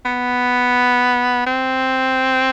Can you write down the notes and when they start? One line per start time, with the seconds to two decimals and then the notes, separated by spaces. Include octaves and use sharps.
0.05 B3
1.46 C4